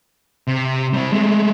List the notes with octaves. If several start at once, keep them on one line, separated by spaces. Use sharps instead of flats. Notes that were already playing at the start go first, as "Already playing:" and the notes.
C3
G3 C4
G#3 A3